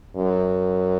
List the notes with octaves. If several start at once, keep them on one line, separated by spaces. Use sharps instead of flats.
F#2